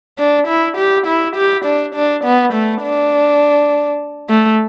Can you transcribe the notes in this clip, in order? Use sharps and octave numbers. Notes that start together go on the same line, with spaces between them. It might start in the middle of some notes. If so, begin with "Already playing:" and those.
D4
E4
G4
E4
G4
D4
D4
B3
A3
D4
A3